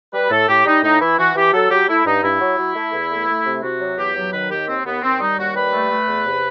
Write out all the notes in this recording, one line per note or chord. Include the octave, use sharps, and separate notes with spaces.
G3 B4
A2 A4
A2 G4
G3 D#4
A2 D#4
E3 E4
E3 F#4
E3 G4
F#3 A4
F#3 G4
A3 E4
G2 D#4
G2 E4
F#3
F#3
A3
E2
A3
A3
C3
C3 F#4
F#3
E2 G4
F#3
D#3 B4
D#2 G4
D#2 C4
D#2 B3
D#2 C4
G3 D#4
D#2 F#4
G3 B4
A3
A3
E2
C3